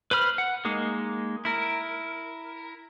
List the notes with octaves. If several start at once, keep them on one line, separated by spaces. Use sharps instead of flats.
B4 C5 B5 F6
F#5
G#3 A#3 D#4
E4 A#4